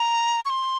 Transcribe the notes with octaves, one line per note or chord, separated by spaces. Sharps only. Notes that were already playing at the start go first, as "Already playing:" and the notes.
Already playing: A#5
C#6
C6